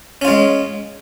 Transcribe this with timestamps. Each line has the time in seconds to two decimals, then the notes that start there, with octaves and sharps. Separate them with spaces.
0.22 C#4
0.25 F4
0.28 G#3